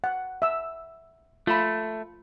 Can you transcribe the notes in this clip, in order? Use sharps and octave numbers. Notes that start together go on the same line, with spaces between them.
F#5
E5 E6
A3 F4 B5